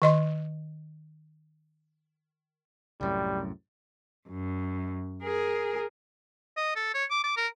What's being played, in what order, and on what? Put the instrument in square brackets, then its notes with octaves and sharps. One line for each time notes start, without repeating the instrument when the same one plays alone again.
[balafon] D#3 D#5 C6
[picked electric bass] C2 F#2 A2 [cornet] G3
[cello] F#2
G#4 A#4
[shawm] D#5
A4
C#5
D6
D6
A#4